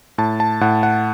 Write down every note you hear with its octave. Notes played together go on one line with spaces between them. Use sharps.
A2 A5
A5
A2 F#5
F#5